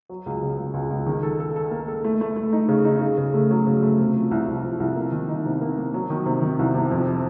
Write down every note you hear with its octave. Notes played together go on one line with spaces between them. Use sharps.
F#3
C#2
C#3
C#2
C#2
C#2
D#3
A4
A4
A4
A#3
A4
A3
A3
A3
D#4
C#3
D#4
C#3
C#3
A3
F#3
C#3
A3
C3
F3
C2
C2
F3
C2
A#3
D#3
D#4
C3
A#3
A#3
F#3
D#3
C3
D#3
C2
C3
F2